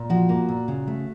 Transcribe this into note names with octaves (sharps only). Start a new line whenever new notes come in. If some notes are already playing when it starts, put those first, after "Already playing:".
Already playing: A#2
F3 F#4
A#3
A#2
C#3
A3